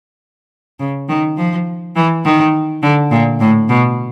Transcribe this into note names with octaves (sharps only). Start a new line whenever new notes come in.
C#3
D#3
F3
E3
D#3
D3
A#2
A2
B2